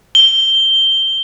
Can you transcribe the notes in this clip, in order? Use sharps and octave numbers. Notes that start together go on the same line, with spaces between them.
G7